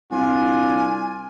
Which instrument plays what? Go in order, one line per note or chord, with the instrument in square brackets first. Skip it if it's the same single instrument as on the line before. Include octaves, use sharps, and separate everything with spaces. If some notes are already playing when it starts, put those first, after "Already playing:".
[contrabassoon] C2 [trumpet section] D4 F4 [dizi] G#5